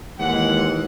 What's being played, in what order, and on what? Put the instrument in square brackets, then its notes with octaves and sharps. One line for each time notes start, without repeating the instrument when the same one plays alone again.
[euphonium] D#2 [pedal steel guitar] E3 [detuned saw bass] G#3 [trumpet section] F#5